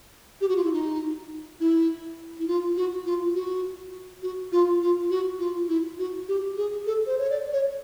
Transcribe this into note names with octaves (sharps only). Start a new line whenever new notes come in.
G4
F#4
F4
E4
D#4
E4
E4
F4
F#4
F4
F#4
F#4
F4
F4
F#4
F4
E4
F#4
G4
G#4
A4
C5
C#5
D5
C#5